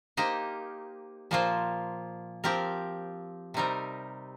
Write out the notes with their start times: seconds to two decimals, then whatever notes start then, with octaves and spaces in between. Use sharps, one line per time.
0.17 A#3 D#4 G4 C5 D#5
1.31 A#2 F3 A#3 F4 C5
2.44 F3 C4 G4 A#4
3.54 C3 G3 C4 D#4 A#4